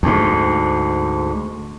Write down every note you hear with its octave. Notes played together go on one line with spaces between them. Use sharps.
D2 G#2